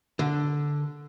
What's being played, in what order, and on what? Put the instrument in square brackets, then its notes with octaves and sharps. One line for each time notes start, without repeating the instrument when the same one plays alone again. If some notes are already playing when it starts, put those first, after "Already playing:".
[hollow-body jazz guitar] D3